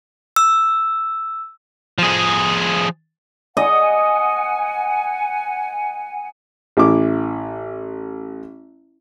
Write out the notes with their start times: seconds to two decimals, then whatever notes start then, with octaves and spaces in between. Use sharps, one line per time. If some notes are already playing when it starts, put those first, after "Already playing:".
0.36 E6
1.98 F3 G#4
3.57 D#5 F#5 G#5
6.77 A1 E4 D6